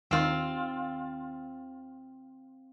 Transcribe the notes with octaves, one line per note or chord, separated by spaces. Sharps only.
D#2 D#3 C4 F4